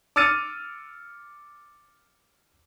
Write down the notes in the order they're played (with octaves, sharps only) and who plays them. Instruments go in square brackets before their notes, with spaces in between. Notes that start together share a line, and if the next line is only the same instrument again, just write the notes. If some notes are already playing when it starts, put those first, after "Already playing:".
[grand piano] D6 E6 F6 A6 C#7 D#7